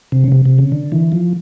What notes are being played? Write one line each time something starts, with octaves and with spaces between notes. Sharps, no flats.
C3
C#3
C3
C3
C#3
D3
E3
F3